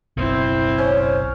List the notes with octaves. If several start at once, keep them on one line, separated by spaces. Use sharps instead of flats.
F#1 B1 C4 E4
C#4 C5